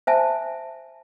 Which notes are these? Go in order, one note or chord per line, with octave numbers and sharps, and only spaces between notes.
C5 E5 G#5 A5